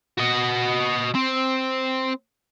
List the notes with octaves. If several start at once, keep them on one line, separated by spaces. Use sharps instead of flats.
F#4 D#5
C4